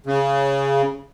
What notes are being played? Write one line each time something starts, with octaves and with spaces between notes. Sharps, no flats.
C#3